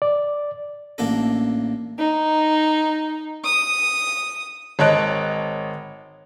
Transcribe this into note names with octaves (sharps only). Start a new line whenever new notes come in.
D5
A1 A#3 D4 A4
D#4
D#6
G#1 C#5 D#5 A5 F#6 D7